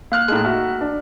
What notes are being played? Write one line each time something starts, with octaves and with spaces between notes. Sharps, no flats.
A#3 F5 F6 F#6
A2 G#3 D#4 F#6
F#4 E5 F6
D4